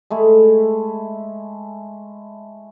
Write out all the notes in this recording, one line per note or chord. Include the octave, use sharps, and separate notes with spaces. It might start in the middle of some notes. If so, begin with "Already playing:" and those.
G#3 A3 E4